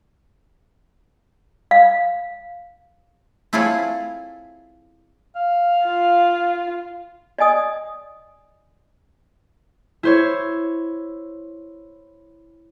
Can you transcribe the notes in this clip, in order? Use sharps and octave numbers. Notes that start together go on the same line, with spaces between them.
F5
C4 E4 F4 G#4 A4 C#5
F5
F4
D5 D#5 G#5 D#6
E4 C5 C#5